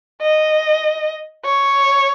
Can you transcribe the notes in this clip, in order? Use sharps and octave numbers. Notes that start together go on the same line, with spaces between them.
D#5
C#5